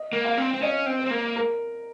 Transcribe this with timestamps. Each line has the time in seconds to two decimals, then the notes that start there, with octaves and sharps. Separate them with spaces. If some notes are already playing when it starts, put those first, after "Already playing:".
Already playing: D#5
0.13 A#3
0.25 F5
0.37 C4
0.54 C4
0.62 C#4 D#5
0.86 C4
0.99 C5
1.06 C4
1.11 A#3
1.36 A#4